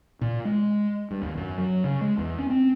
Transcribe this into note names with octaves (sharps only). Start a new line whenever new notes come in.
A#2
G#3
G2
D#2
F#2
F#3
C#3
G#3
E2
C#4
C4